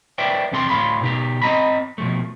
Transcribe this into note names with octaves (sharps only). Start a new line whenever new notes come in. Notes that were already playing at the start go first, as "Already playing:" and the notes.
B4 C5 D5 E5 G5
E2 C3 C4 A4 C6
D2 A2 F5 B5 C6
B2 D#4 G4
C4 D#5 A#5 B5
B2 F3 A3